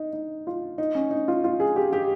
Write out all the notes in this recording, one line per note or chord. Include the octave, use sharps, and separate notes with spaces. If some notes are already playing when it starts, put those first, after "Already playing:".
Already playing: D#4
D#4
F4
D#4
C#4
D#4
F4
F4
G#4
G4
G4